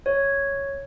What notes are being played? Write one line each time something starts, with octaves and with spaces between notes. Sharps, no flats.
C#5